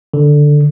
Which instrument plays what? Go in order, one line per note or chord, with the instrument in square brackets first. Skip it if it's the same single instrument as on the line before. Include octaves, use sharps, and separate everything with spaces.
[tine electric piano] D3